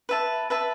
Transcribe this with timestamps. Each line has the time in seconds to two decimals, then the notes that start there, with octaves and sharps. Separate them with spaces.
0.09 B4 E5 A5
0.50 B4 E5 A5